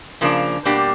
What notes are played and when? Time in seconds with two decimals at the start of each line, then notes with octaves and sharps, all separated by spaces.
0.21 C#3 F3 A#3 D4
0.65 B2 G3 A#3 D4 G4